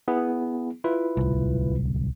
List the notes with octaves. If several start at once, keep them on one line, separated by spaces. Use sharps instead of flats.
B3 E4 G#4
E4 F4 B4
D1 C2